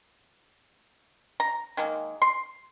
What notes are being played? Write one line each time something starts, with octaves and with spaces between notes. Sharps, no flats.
A#5
D#3 G#3 A#3
C6